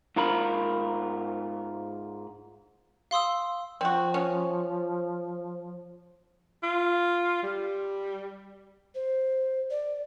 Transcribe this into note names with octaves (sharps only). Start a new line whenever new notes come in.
G#2 F4 A#4 B5
F5 C6 D#6 E6
F3 C4 F#4
C#4
F4
G3
C5
D5